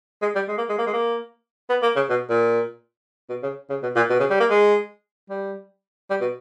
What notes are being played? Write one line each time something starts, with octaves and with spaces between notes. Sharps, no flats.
G#3
G3
G#3
A#3
G#3
A#3
G#3
A#3
B3
A#3
C#3
B2
A#2
B2
C#3
C#3
B2
A#2
B2
C#3
G3
A#3
G#3
G3
G3
B2